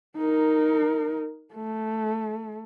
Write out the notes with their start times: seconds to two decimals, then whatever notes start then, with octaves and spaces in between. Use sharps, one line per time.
0.17 D#4 A#4
1.54 A3